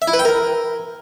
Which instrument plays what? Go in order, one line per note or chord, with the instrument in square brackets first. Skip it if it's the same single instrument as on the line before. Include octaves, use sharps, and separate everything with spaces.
[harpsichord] E5
E4
B4
G5
A#4